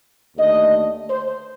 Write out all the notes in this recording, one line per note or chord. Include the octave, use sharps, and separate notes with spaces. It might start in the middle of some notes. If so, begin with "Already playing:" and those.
D#2 D3 A3 D#5
C5